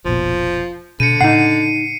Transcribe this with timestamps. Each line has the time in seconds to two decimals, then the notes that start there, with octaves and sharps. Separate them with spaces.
0.05 F1 A#1 B2 F3
1.00 B2 D3 C#7 D#7
1.21 A2 C#3 D4 D#4 F#5 C7